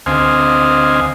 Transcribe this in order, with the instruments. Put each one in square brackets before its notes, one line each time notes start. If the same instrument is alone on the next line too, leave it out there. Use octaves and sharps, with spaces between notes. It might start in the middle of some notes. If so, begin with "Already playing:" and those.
[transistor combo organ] D2 C4 C5 D#5 F5 G#5